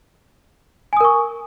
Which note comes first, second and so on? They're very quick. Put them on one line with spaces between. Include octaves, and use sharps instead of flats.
G#5 D#6 A#4 C#6